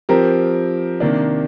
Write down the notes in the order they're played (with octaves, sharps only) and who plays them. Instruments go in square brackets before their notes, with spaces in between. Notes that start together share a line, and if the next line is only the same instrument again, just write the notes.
[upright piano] F3 C4 G4 A#4
C3 D#3 A#3 D4